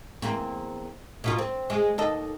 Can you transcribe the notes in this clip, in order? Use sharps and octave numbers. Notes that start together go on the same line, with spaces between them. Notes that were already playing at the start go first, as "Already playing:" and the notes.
E2 A#3 C4
B2 A#3 F4
C4
G#3
D#2 A4 D#5